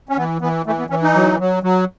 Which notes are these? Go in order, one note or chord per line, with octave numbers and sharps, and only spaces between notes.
C#4
E3 B3
E3 B3
E3 A3
B3
E3 C#4
D#4
F#3
F#3
F#3